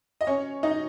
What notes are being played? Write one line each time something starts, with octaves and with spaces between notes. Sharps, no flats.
D#5
C#4 C#5
D#4 D#5